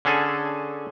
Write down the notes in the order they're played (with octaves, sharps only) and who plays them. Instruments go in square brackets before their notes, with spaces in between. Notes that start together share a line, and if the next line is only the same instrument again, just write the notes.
[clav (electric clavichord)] D3 C#4 G#4 A4 G#5